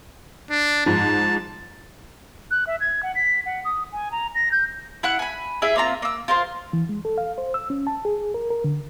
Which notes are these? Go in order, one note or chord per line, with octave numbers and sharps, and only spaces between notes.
D4
G#2 F3 A5
F#6
E5
G#6
F#5
B6
F#5
D#6
G#5
A#5
A#6
G6
E4 F#5 F#6
G#5 B5
E4 G#4 D#5 E5
A#3 C4 F4 A#5
A#3 E6
F4 A#4 C5
E3
G#3
A4
F5
C5
E6
C#4
A5
G#4
A#4
A#4
D3